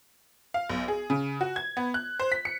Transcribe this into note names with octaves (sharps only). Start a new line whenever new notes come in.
F5
B1
G#4
C#3
F#4
G#6
B3
F#6
C5
B6
C#7